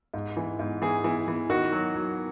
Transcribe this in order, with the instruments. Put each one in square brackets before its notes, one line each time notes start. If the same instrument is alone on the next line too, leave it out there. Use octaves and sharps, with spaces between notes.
[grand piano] G#2
E3
G#2
E3 G#4
E3
E3
D#3 F#4
F#3
F#3